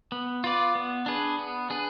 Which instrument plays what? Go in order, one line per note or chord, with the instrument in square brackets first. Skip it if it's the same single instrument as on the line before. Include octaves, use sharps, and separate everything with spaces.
[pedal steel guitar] B3
F4 B4 D5
B3
D4 G#4 B4
B3
D4 G#4 B4